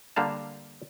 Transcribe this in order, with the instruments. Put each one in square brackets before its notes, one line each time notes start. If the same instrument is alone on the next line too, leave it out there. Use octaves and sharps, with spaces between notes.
[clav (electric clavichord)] D3 G3 A#3 F5 A5